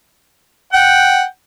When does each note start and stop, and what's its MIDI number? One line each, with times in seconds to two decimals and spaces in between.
0.73 1.23 78
0.73 1.23 79